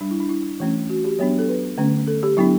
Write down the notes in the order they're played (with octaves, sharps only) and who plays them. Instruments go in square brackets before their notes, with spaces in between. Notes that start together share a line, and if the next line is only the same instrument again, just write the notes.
[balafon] G3 D4
E4
D4
E4
E3 A3 C#4
F#4
G4
F#3 B3 D4 C#5
A4
B4
D3 A3 C#4
A4
G4
F#3 B3 D4 E4